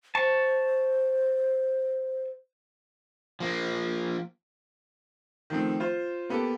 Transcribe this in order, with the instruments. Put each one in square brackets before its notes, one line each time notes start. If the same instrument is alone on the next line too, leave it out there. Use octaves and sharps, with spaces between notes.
[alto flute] C5 [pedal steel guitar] A5 C#6
[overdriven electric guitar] F3 A#3
[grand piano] D#3 F3 A3 C4
F4 C5
A#3 B3 G4 A4